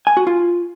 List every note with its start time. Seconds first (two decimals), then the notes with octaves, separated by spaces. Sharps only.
0.07 G#5
0.17 F#4
0.27 F4